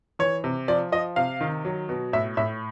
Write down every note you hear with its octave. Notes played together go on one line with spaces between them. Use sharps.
E3 C#5
C3
F3 D5
F3 D#5
C3 F5
D#3
F#3
B2
A2 E5
A2 E5